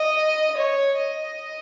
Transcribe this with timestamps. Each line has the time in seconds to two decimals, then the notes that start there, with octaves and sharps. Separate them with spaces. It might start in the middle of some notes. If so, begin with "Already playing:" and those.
Already playing: D#5
0.57 C#5
0.97 D#5